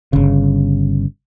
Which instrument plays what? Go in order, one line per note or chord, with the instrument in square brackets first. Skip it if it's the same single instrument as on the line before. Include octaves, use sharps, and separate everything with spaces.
[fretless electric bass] G1 C#3